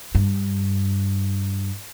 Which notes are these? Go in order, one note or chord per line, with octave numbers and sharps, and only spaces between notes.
G2